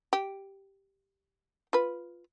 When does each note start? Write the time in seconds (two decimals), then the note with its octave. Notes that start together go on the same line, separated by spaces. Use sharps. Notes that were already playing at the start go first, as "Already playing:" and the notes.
0.13 G4
1.73 F4 B4